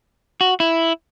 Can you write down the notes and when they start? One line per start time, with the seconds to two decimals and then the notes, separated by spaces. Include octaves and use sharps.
0.41 F#4
0.60 E4